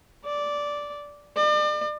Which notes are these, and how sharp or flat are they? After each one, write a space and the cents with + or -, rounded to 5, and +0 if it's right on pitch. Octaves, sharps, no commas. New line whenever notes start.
D5 -5
D5 +40